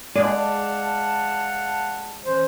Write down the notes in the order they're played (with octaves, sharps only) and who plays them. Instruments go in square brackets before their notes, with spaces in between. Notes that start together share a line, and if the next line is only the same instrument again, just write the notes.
[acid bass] G#3 [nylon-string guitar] D5 [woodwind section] F5 F#5 A5
[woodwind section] E3 C#4 [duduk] C5